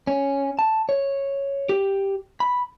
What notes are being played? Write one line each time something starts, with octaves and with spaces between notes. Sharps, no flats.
C#4
A5
C#5
G4
B5